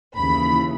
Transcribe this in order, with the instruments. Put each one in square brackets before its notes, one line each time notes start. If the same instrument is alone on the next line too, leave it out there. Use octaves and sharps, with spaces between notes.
[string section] D#2 C#3 E3 B5